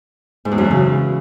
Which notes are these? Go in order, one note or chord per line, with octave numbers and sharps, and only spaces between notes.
G#2
E2
F#2
E3
C#3